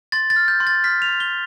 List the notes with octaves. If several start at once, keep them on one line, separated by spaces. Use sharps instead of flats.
C6 A6
A6
F6
G6
C6
A6
F6 B6
F7
C6
G7